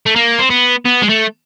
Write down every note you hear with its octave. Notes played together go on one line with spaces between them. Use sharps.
A3
A#3
C4
B3
B3
G#3
A3